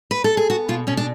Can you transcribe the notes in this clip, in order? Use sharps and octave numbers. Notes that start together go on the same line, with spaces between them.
B4
A4
G#4
B3 F#4
B2 F4
B2 C#4
D4